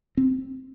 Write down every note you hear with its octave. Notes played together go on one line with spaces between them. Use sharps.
C4